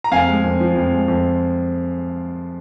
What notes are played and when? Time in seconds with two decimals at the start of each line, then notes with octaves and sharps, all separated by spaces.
0.04 A#5
0.11 F2 F5 G#5
0.28 G#3
0.44 F2
0.60 F3
0.76 F2
0.93 G#3
1.08 F2